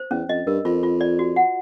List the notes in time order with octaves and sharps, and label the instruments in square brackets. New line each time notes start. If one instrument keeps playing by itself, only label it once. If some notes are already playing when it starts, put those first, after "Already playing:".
Already playing: [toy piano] C5
[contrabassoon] E2 [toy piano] C#4
[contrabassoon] F2 [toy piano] D#5
[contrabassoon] G2 [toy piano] A#4
[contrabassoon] F2 [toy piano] F4
[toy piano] F4
D5
F#4
F#5